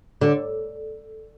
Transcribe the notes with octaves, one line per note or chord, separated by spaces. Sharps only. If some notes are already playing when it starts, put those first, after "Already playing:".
D3